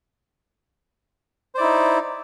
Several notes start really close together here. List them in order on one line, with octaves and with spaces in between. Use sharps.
C5 D5 E4 D#4